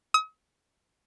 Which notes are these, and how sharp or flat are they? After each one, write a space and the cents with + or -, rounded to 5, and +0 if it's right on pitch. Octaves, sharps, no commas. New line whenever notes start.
D#6 +40